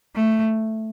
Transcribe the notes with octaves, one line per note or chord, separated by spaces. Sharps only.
A3